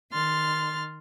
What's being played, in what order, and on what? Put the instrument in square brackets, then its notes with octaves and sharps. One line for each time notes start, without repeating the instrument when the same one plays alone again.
[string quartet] D#3 C6 F6 A6